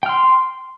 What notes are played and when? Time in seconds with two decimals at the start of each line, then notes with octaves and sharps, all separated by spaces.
0.03 G5
0.06 F6
0.09 C6